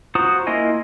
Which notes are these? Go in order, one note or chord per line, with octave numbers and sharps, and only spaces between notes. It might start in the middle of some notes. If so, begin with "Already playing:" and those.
F4 F#4 C5 A#5 D#6
A#3 E4 F4 D#5 G#5